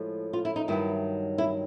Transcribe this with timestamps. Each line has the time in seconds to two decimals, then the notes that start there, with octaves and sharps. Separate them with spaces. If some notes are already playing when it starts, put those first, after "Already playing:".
Already playing: A2 F3 G#3
0.33 F4
0.45 E4
0.56 D#4
0.68 G2 D#3 F#3 E4
1.38 E4